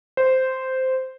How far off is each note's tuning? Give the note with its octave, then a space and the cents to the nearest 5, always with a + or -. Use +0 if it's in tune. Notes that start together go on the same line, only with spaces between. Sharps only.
C5 -10